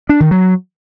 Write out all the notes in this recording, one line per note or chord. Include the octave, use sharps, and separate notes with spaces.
D4
D#3
F#3